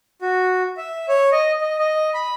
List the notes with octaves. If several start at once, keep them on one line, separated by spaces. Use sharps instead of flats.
F#4
E5
C#5
D#5
D#5
D#5
B5